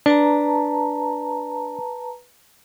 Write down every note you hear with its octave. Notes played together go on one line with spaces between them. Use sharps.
D4 B4 A5 A#5